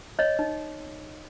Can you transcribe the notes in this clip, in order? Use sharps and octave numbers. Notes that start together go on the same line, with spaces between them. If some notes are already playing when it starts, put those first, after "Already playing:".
C#5 D#5
D#4